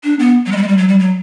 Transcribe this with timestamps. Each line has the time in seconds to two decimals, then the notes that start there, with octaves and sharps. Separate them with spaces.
0.04 D4
0.19 B3
0.46 F#3
0.52 G#3
0.57 G3
0.62 G#3
0.68 G3
0.78 F#3
0.88 G3
0.99 F#3